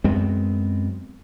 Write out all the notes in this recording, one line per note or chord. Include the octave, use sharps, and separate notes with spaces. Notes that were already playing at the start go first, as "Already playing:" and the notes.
F#2 G#3 B3 C4